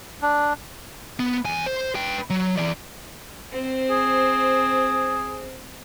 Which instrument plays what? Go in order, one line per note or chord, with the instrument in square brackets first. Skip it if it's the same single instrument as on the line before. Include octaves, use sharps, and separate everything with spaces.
[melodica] D4
[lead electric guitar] B3
E2 G#5
C5
B4 G5
F#3
E3 D5
[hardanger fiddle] C4 C5
[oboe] G#4